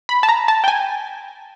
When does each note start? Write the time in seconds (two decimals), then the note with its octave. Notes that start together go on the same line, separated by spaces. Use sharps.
0.09 B5
0.23 A5
0.29 A#5
0.48 A5
0.64 G5
0.68 G#5